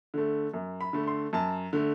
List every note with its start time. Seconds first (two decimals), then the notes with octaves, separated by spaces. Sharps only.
0.14 D3 A3
0.54 F#2
0.81 B5
0.93 D3 A3
1.08 C6
1.33 F#2 A5
1.73 D3 A3